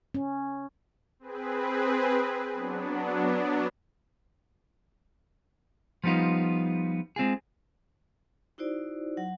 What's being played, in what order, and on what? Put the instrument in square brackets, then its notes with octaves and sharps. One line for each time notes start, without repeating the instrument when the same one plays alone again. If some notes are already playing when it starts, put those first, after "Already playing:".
[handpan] C#4
[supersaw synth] C4 G#4 B4
F#3 B3 D4
[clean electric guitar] F3 G3 B3 D#4 F4
G#3 C4 F4 G#4
[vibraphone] D#4 E4 F#4 C5 D5
F#3 F#5